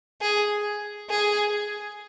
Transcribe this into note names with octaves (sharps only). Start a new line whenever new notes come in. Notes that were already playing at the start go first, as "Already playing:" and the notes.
G#4
G#4